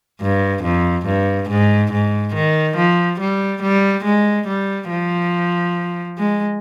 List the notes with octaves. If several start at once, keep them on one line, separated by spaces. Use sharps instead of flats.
G2
F2
G2
G#2
G#2
D#3
F3
G3
G3
G#3
G3
F3
G#3